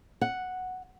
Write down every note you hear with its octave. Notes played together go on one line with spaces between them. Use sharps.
F#5